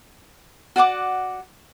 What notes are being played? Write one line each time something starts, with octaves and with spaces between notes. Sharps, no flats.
F#4 D5 F#5 D6